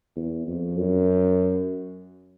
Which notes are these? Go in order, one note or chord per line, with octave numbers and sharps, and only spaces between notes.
E2
F2
F#2